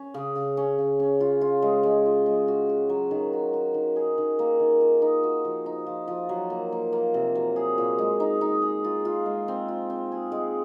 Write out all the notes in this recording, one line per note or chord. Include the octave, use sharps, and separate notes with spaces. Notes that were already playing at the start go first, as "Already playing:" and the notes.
Already playing: C#4
C#3
C#3
C#4
C#3
C#4
F4
F4
G#3
G#3
F4
G#3
F#4
F#4
F#3
D#3
F#4
F#4
D#3
G#4
D#3
A#3
D#3
F4
D#4
F#4
F3
D#4
F3
F3
F#3
A#3
A#3
A#3
C3
F#3
G#4
A#2
G#3
D#4
D#4
G#4
F4
F4
G#3
C4
F4
C4
G#4
G#3